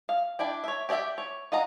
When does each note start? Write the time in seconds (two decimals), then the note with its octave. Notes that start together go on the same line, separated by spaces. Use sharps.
0.09 F5
0.39 D4 E4 D5 G5
0.64 C#5 E5
0.89 G4 C#5 D5 E5 G5
1.18 C#5
1.52 F4 D#5 F#5 A#5